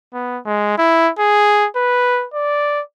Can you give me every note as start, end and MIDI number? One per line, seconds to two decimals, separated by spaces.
0.13 0.38 59
0.45 0.76 56
0.78 1.09 64
1.19 1.66 68
1.76 2.25 71
2.33 2.81 74